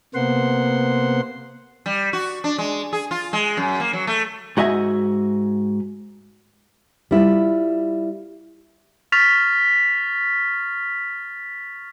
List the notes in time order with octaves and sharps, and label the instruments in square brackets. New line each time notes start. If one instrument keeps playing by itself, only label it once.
[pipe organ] C3 A#3 B3 C5 F#5 C6
[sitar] G3
F#4
D4
G#3
G#4
F4
G#3
F#2
A#3
F#3
A3
[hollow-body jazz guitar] G#2 F#4 D#5 E5 G#5
[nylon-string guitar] G3 E4 F4
[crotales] C#6 F6 A6 B6 F7